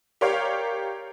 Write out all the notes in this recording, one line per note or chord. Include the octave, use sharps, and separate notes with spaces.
G4 A#4 C#5 D5 F5